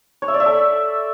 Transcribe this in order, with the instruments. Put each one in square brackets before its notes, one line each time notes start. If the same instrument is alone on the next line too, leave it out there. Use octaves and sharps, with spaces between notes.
[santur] C#5
E5
D5
E5
A4